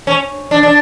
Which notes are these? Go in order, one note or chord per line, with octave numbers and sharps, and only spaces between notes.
C#4
D4
D4